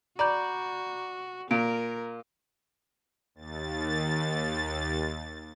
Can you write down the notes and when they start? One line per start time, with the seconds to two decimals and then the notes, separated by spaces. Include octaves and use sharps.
0.19 F#4 D5 A#5 B5 G6
1.51 A#2 A#4 D7
3.35 D#2 A6